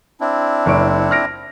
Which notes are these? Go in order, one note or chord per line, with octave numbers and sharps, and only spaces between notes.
C4 D4 E4
F#1 C#6 D7
F6 A#6 D7